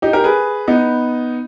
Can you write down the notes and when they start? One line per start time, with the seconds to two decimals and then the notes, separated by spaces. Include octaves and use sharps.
0.02 D#4 G4
0.13 G4 A#4
0.24 G#4 B4
0.68 B3 D#4